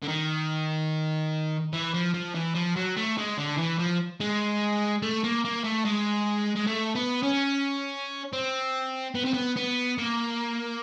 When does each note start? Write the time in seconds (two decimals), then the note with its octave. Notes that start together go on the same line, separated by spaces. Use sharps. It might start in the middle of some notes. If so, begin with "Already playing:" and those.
0.03 D3
0.09 D#3
1.73 E3
1.94 F3
2.14 F3
2.35 E3
2.55 F3
2.76 F#3
2.96 A3
3.18 G#3
3.38 D3
3.58 E3
3.79 F3
4.20 G#3
5.02 A3
5.24 A#3
5.45 A#3
5.64 A3
5.85 G#3
6.56 G#3
6.67 A3
6.95 B3
7.23 C#4
8.33 C4
9.15 B3
9.25 C4
9.34 B3
9.56 B3
9.98 A#3